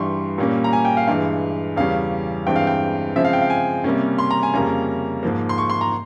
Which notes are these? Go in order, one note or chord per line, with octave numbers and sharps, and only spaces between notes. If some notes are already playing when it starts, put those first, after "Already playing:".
Already playing: G2 E3 G3 C6 C#6
A#2 G3 A#3 C#4
A#5
G#5
G5
F5
G2 E3 G#3 F5
E2 C#3 G3 C#4 F5
G2 E3 G#3 C4 G5
F5
G5
C#3 F3 G#3 C4 E5
F5
G5
F5
G#5
C3 G3 A#3 C#4
C6
A#5
G#5
F2 C#3 G3 A#3 C#4 A#5
G#2 F3 A#3
C6
C#6
C6
A#5